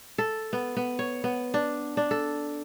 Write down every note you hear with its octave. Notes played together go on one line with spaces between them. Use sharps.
A4
B3
B3
C#5
B3
D4
D4
A4